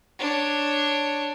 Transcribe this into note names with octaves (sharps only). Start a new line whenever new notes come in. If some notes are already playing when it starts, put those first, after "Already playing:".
D4 C#5